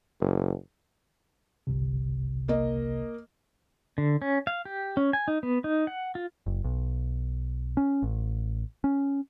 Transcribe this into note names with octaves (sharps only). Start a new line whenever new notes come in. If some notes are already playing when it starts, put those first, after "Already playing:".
F#1
G1 C2 C3
A#3 D#5
D3
C#4
F5
G4
C#4
G#5
D#4
B3
D#4
F#5
F4
F#1
B1
C#4
A1
C#4